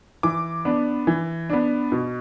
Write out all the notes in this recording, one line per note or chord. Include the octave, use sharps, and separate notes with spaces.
E3 D6
B3 D4
E3
B3 D4
B2